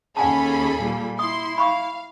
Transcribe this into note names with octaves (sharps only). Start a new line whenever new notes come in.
D#2 C#4 G#4 A4 F#5 G#5 A5 B5
A#2 G3
E4 C6 D#6
F5 B5 C#6 D6